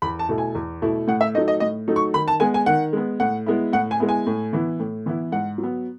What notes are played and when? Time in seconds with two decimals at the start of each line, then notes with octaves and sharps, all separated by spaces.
0.02 E2 B5
0.19 A5
0.29 B2 A3 E4
0.38 G#5
0.55 E2
0.82 B2 A3 E4
1.07 A2 F#5
1.21 E5
1.35 F#3 A3 D#4 D#5
1.48 D#5
1.60 A2 D#5
1.88 F#3 A3 D#4
1.96 C#6
2.14 D#3 B5
2.28 A5
2.40 G#3 B3 G#5
2.54 G#5
2.66 D#3 F#5
2.93 G#3 B3
3.20 A2 F#5
3.46 G#3 B3 E4
3.73 A2 F#5
3.91 G#5
4.00 G#3 B3 E4
4.09 G#5
4.27 A2
4.53 E3 B3 E4
4.80 A2
5.06 E3 B3 E4
5.32 G#2 F#5
5.58 F#3
5.63 B3